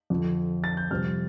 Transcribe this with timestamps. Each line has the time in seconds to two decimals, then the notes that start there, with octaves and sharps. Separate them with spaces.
0.10 F2 D3 F3 C4
0.64 A6
0.77 G6
0.91 F2 C3 G3 C4 F6